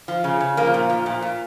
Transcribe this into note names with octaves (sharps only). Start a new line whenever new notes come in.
F3
C#3
C#3
F3 A#3
A#2
F3
A#2
A#2